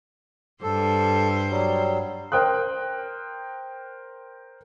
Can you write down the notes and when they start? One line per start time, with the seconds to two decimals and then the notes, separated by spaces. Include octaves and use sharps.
0.63 G2 A4 C5
1.50 F#3 G3
2.32 A#4 C5 G5 D#6 F#6